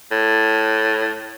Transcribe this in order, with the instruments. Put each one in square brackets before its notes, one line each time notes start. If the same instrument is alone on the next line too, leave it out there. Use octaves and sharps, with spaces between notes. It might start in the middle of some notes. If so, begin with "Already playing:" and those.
[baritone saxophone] A2